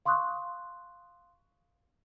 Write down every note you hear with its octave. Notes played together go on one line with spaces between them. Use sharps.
F5 C6 C#6 D#6 F#6